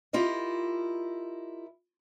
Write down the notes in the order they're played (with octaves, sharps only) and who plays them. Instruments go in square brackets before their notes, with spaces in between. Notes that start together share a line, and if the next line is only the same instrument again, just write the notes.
[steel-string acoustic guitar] E4 F4 G4 A#4 D#5